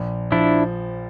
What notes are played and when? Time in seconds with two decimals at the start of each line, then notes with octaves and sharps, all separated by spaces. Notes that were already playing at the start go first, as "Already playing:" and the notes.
Already playing: A#1
0.32 F3 D4 E4